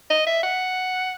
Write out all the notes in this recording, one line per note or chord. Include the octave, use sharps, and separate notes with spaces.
D#5
E5
F#5